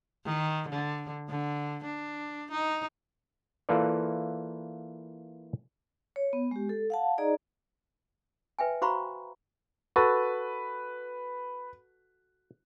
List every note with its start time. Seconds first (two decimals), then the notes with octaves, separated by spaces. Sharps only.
0.25 D#3
0.68 D3
1.29 D3
1.85 D4
2.51 D#4
3.69 E3 A#3 F4 A4 B4 D5
6.16 C#5
6.33 B3
6.51 G#3 G4
6.69 A4
6.90 F5 F#5 A5
7.18 D#4 G#4 D5 D#5 A#5
8.59 B4 E5 G5 G#5
8.82 F#4 C5 F5 A#5 B5 C#6
9.96 F#4 A4 B4